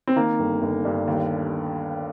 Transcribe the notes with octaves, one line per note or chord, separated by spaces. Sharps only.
C4
D#3 A#3
G1
G1
G2
D#2